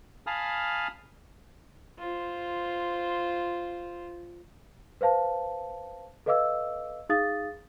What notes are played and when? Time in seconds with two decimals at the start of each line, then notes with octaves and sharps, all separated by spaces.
0.27 F5 G#5 A5 B5 D#6 F6
1.99 F4 C5
5.01 B4 C5 F5 A5
6.26 A4 B4 D#5 F5 D6 E6
7.09 D#4 G#4 F5 D#6 A6